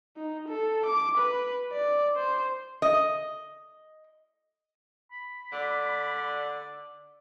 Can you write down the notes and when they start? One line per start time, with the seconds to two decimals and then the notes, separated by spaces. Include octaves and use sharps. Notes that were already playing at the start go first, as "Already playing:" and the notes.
0.17 D#4
0.48 A4
0.86 D6
1.17 B4
1.72 D5
2.16 C5
2.82 D#5
5.12 B5
5.52 D3 D5